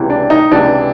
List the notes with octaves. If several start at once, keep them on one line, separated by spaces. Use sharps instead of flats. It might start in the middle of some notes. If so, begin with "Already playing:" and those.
Already playing: C#2 C3 E3
D4
D#4
C#2 C3 E3 D4